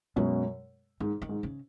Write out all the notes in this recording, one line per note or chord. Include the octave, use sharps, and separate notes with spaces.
F#2 B2 G#3
G#2 D#3
D#3
G#2
C#3